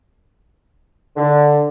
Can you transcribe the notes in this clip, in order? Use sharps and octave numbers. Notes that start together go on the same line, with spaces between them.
D3